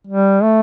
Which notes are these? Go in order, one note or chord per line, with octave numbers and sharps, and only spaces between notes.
G3
A3